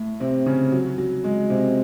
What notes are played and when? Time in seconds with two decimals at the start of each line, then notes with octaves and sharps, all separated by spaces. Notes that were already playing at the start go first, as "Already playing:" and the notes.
Already playing: A2 A3
0.20 C3 C4
0.46 C#3 C#4
0.72 F#3
0.98 F#3
1.24 G#3
1.50 C3 C4